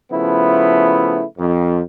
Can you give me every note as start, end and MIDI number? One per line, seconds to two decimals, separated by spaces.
0.12 1.23 49
0.12 1.23 53
0.12 1.23 57
0.12 1.23 59
0.12 1.23 64
1.38 1.79 41